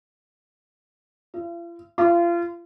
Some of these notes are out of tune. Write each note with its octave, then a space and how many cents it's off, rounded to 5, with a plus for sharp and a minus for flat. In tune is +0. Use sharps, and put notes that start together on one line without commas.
F4 -45
F4 -30